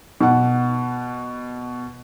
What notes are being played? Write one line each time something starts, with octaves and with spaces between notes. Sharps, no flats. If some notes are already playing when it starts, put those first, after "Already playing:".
B2 F#5